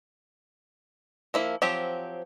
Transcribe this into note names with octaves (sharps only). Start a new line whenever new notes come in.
F3 A#3 E4
F3 F#3 C4 G4